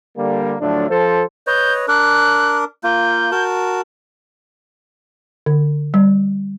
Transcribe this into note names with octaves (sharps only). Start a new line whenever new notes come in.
D3 G3 A#3
A2 D3 F3 F#3 A3 D4
F3 A4 C5
B4 C#5 D#5 G6
D4 A#4 F#6
A#3 F4 G6
F#4 A#4 A5
D3
G3